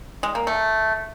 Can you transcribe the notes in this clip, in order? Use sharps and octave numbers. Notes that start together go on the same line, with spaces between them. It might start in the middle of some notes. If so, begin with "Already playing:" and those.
G#3
A#3
A3